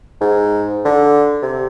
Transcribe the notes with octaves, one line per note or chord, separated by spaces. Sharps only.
G#2
D3
C3